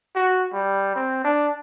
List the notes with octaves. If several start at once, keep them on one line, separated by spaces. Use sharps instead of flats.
F#4
G3
C4
D4